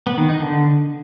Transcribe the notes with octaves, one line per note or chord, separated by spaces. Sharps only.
B3
D#3
D#4
D3